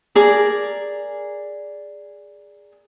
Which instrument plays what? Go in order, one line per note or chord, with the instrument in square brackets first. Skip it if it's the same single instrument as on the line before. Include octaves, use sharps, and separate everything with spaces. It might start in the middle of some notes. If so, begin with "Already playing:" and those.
[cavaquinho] G#4 A#4 D5 A#5